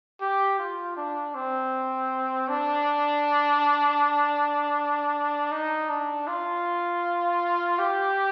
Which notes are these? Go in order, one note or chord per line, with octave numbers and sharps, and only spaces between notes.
G4
F4
D4
C4
D4
D#4
D4
F4
G4